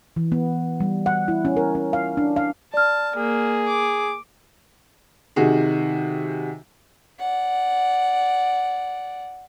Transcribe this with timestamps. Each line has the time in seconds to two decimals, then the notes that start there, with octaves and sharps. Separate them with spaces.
0.16 E3
0.32 B3
0.80 G3
1.06 F#5
1.28 E4
1.45 C#4
1.57 A#4
1.75 C#4
1.93 F5
2.17 D4
2.36 F5
2.74 D5 A5 F6
3.17 A#3 G#4
3.68 D6
5.36 C3 D#3 F#4 G#4
7.19 D5 F#5